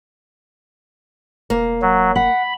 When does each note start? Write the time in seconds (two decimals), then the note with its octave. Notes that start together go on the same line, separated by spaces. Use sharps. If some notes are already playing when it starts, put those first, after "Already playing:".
1.50 E1 A#3
1.82 F#3
2.16 F#5 B5